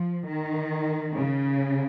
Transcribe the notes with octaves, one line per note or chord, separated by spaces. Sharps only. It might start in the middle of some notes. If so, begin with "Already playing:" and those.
Already playing: F3
D#3
C#3